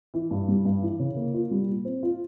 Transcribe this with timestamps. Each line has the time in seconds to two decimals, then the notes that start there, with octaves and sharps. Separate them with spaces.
0.14 E3
0.31 G2
0.48 G3
0.65 G2
0.82 E3
0.99 C#3
1.16 A#3
1.34 F4
1.51 G3
1.68 A#2
1.85 C4
2.03 F4